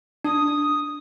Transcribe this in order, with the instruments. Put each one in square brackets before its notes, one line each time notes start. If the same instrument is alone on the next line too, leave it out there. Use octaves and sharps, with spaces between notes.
[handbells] D4 [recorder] D#6